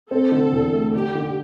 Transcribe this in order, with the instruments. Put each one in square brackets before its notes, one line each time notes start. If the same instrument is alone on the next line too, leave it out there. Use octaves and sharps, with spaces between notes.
[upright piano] C4 [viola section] A4
[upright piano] D3
E2
A3
[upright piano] D3 [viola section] G4
[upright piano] D3